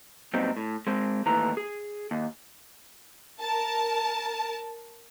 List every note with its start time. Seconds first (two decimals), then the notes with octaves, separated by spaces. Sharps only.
0.34 A#2 F#3 G3 B3 C4 D#4
0.57 A2
0.87 G#3 C4
1.26 D#2 A2 E3 A#5
1.57 G#4
2.11 D#2
3.40 A#4 A5